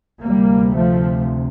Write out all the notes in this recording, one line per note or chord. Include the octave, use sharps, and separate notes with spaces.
D2 C3 G3 A#3
F3 A3